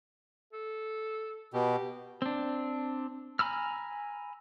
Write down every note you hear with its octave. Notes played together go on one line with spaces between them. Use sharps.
A4
B2 G4
C4 D4
G#5 A#5 B5 E6 F6